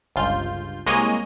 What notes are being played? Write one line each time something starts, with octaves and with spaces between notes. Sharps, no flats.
G1 C#2 F4 G6
C2 G#3 A#3 C#5 D#5 D#7